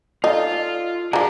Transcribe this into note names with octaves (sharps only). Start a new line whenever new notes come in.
D#4 F4 A4 D5 F5
D3 F3 F#4 G#4 A#5